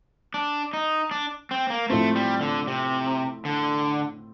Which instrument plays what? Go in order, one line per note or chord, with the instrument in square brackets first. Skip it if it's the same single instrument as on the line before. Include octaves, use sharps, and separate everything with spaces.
[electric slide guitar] D4
D#4
D4
C4
A#3
[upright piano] A2 F3 C4 [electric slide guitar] A3
[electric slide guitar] G3
D3
C3
D3